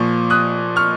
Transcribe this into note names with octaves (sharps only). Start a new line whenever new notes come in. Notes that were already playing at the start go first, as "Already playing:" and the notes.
Already playing: A#2 F3 C#6
D#6 F#6
C#6 F6